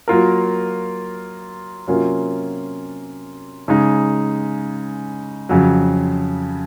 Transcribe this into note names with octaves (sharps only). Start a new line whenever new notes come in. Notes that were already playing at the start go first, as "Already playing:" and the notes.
F#3 A#3 F4 A#4
C3 F#3 A#3 C#4 F4
C#3 G#3 D#4
F2 C#3 F#3